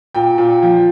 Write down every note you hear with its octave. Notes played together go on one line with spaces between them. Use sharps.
A#2 G5
A#2
F3